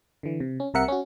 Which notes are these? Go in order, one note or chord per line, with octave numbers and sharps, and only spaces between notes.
D3 E3
C3
C#4
C2 C3 A#4 E5 F#5 C#7
C#4 F#4